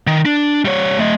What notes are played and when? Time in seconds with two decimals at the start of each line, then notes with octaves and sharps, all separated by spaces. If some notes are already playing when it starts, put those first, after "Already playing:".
0.07 D#3
0.25 D4
0.65 G3 C#5
0.99 A3 D#5